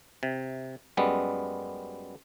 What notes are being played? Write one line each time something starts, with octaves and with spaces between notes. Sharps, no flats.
C3
F#2 G3 G#3 B3